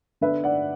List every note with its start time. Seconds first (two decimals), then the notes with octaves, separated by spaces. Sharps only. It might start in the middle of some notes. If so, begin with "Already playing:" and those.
0.21 D3 B3 D4 B4 E5
0.44 D5 F#5